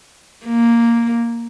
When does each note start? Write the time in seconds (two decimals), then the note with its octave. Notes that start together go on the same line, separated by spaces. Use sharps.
0.45 A#3